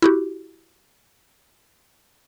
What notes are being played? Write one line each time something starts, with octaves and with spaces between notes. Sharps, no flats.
E4 F#4 G4